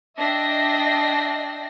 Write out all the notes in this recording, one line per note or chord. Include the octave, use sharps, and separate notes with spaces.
D4 D#5 E5 G5 A#6 C7